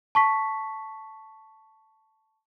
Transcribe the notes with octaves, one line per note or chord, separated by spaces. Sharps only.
A5 C#6 B6